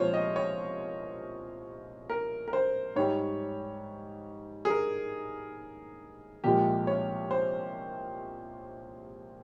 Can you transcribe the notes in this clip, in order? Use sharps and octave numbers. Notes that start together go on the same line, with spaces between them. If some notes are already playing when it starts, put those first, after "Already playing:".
Already playing: C2 A#2 F3 G#3 F4 C5 C#5
D#5
C#5
A#4
A#4
C5
G#2 G3 C#5
G#4
A#4
C2 A#2 F3 G#3 G4
C#5
C5